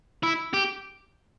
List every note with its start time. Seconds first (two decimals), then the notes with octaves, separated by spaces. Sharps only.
0.23 E4
0.54 G4